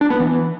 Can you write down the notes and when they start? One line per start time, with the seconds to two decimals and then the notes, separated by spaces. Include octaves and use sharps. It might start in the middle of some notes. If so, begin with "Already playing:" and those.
0.01 D4
0.10 B3
0.19 E3